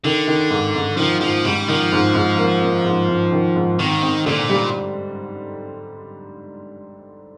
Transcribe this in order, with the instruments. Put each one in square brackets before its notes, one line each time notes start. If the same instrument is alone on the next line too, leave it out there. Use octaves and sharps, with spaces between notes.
[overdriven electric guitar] D3 [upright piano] D#3
[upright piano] D#3
G#2
G#2
[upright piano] D#3 [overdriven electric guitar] F3
[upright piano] G#2 [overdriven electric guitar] F3
[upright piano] G#2 [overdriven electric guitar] G3
[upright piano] D#3 [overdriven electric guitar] F3
[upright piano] G#2
G#2
A#3
A#3
G#2
G#2
D#3
G#2
[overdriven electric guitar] D#3 [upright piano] C4
[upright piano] C4
[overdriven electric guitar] A#2 [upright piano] D3
[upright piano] G3